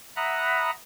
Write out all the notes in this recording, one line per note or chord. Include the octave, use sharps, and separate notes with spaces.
E5 F#5 A#5 B5 D#6 F#6